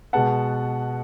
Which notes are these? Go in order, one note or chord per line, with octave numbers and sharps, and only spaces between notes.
B2 G#3 B3 F#5 A5